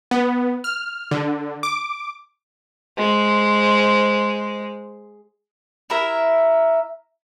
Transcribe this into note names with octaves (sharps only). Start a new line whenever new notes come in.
B3
F6
D3
D6
G#3 C5
E4 A#4 E5